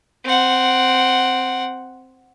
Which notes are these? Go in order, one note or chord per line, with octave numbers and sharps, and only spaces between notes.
C4 F#5